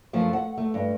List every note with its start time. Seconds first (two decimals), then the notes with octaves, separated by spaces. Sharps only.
0.13 F#2 F3 A3 F4 C5
0.33 F#5
0.58 A3
0.74 G2